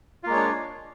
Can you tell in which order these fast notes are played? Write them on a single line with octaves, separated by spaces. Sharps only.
F4 A#3 G#3 C#5 D4